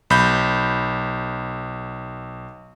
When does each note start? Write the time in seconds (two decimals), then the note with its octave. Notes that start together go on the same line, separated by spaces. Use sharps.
0.10 B1 B5 G6